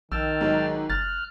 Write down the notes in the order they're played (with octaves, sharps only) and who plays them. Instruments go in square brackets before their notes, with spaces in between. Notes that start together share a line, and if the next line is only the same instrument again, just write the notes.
[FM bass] A#1 [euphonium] D#3 [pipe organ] G5 A5 F6 [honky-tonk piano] E6
[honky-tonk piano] G#2 F#3 G#3
[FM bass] F#1 [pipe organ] F6 F#6 [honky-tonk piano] A6